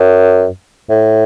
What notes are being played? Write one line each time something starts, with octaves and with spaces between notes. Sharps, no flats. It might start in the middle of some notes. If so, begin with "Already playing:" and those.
Already playing: F#2
A2